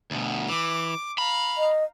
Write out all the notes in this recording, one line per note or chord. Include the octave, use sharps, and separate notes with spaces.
D2 B2
E3 D6
F5 A#5 B5
D#5